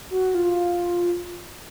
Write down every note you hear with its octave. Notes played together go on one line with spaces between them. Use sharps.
F#4
F4